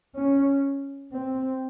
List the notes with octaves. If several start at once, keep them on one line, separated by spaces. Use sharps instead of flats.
C#4
C4